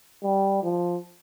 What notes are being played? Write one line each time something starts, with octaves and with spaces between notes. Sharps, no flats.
G3
F3